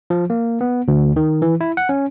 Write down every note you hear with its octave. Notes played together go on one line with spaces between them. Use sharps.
F3
A#3
B3
D2
D#3
E3
E4
F#5
C#4